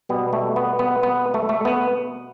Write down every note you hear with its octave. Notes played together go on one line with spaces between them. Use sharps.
B2 G3 B3
A3
B3
B3
B3
A3
A3
B3